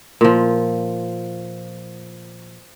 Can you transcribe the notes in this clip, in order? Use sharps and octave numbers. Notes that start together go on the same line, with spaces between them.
A#2 F3